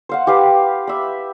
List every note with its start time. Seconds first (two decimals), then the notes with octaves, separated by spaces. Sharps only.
0.09 C5 F5 F#5
0.27 G4 B4 F5 D6
0.87 E5 B5